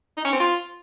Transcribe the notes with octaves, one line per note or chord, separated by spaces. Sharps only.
D#4
C#4
C4
F4